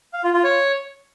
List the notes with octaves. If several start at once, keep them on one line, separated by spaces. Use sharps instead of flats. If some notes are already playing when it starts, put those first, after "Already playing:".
F5
F4
F4
C#5